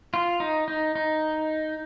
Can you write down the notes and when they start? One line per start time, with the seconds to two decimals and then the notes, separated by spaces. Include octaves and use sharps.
0.14 F4
0.40 D#4
0.68 D#4
0.95 D#4